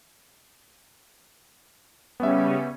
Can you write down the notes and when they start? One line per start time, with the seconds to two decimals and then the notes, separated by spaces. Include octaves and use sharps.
2.20 C#3 G3 B3 C#4 E5